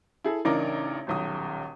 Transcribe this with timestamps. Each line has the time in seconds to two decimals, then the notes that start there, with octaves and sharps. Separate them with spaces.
0.24 E4 G#4 A4
0.45 A1 C#3 D4 D#4 A#4 D6
1.07 D#1 B1 D#6